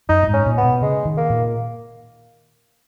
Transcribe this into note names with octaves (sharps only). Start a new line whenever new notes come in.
F#2 D#4
A#2
G#2
C#4
A#2
B3
B2
C#3 G#3
D#3
A#3
A#2